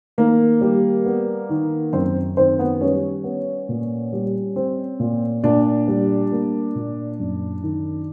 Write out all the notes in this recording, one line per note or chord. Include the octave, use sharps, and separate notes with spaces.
D#3 A#3 A#4
G3
B3
D#3
F#2 C4 C5
D#3 C4 C5
B3 B4
G3 C#4 C#5
B3
A#2
G3
C4
A#2
A#2 D4 D5
G3
A#3
A#2
F#2
D#3